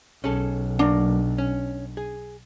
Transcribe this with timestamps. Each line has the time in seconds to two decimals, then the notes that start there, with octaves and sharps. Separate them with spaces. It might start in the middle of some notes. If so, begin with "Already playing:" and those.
0.24 B1 C#4 G#4 A4
0.79 F#3 A#3 D4
1.38 C#4
1.97 G#4